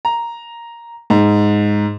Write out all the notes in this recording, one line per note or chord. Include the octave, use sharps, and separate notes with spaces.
A#5
G#2